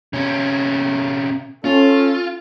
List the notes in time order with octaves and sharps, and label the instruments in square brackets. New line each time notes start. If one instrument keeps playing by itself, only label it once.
[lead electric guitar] C3 C#4
[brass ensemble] C#4 A4 [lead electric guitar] F4